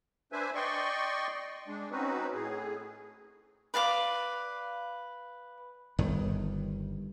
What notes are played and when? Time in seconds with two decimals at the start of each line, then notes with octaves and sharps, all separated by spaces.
0.32 D4 B4 C5 E5 G#5
0.55 D5 D#5 G5 C6 C#6
1.68 G#3 D4
1.91 C4 C#4 D#4 F#4 B4
2.34 A2 G#4
3.74 B4 D5 F5 D6
5.99 G1 G2 D#3